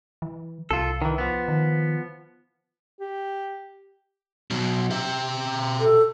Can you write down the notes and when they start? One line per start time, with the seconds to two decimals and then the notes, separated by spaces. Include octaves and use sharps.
0.22 E3
0.71 C2 F4 A4
1.02 D#3 E3
1.18 F3 B3
1.48 D#3
2.99 G4
4.51 B2 F#3
4.91 G4 E5
5.80 A4